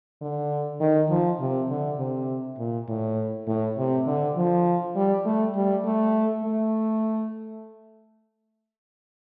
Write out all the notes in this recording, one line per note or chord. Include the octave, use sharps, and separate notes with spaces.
D3
D#3
F3
C3
D3
C3
A#2
A2
A2
C3
D3
F3
G3
A3
G3
A3
A3